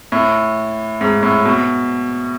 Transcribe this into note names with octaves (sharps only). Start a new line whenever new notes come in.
A2
G#2
A2
B2